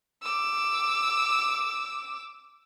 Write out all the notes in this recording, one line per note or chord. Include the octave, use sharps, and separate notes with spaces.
D6 E6